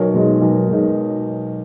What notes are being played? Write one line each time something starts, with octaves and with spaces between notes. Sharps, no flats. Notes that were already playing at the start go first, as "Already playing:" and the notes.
Already playing: B1 A#4 C#5
B2 G#3 D#4
B1
B2 G#3 D#4